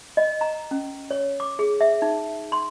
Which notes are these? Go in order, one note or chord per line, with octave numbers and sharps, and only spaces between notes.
D#5
A#5
C#4
C#5
D6
G#4
E5
D#4
C6